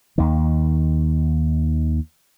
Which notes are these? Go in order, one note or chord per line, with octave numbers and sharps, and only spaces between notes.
D#2 D#3